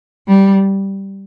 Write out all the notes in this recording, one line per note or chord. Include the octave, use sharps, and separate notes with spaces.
G3